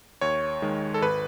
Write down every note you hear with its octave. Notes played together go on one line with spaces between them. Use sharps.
D#2 C#5
D#3 G#3
A4
G#1 B4